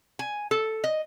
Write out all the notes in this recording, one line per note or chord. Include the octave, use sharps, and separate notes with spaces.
G#5
A4
D#5